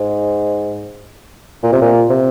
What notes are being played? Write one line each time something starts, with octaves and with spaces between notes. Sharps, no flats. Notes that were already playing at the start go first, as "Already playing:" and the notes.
Already playing: G#2
A#2
C3
A#2
C3